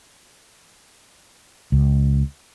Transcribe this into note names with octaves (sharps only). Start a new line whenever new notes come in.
C#2